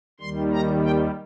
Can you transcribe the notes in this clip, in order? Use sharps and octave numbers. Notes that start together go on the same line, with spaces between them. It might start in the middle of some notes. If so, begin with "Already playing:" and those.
D#2 D#3 G3 C6
A#5
G5